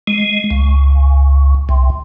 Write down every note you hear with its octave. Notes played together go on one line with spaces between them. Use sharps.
G#3
C#2
C2